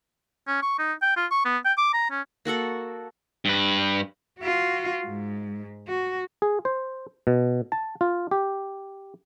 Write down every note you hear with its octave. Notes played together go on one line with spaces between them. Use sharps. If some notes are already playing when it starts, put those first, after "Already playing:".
C#4
C#6
D#4
G5
F4
C#6
B3
G5
D6
A#5
C#4
A#3 F#4 A4 F#5
G2 B4
F4 F#4
G#2
F#4
G#4
C5
B2
A5
F4
G4